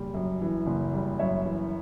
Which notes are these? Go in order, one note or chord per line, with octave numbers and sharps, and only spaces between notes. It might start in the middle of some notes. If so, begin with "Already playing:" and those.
Already playing: F#1 G3 G4
F#2
E3
F#1
G3
F#2 C#5 E5
E3